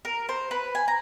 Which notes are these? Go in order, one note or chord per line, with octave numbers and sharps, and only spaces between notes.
A#4
C5
B4
G#5
A#5